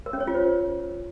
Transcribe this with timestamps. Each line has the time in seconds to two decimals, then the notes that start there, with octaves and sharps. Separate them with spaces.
0.06 A#4
0.13 C#4
0.20 C#5
0.27 F4
0.34 C5